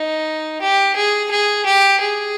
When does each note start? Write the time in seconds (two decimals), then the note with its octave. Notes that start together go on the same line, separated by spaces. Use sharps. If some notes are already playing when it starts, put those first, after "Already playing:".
Already playing: D#4
0.62 G4
0.96 G#4
1.31 G#4
1.66 G4
2.00 G#4